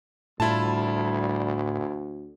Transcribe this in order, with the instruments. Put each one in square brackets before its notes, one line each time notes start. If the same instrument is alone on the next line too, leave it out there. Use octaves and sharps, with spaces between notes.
[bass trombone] D2 [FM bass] A2 [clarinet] G3 [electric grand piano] E4 F4 A5